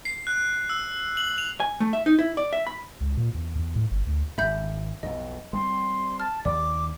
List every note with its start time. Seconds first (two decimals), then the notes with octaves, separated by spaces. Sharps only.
0.05 C7
0.27 F#6
0.69 E6
1.17 F#7
1.38 F7
1.60 G#5
1.80 A3
1.93 E5
2.06 D#4
2.19 E4
2.37 D5
2.53 E5
2.67 B5
3.01 C#2
3.17 A#2
3.34 E2
3.56 E2
3.76 A2
3.91 G1
4.07 D2
4.38 G#1 F#2 E5 B5 G6
5.03 B1 F2 B2 D#5
5.53 G3 B3 C4 C6
6.20 A5 F6
6.45 D#2 D5 D6